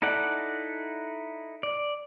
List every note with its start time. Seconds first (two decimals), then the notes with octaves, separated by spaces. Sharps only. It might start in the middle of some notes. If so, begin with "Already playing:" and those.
0.02 D#4 E4 A4 D5 F#5
1.63 D5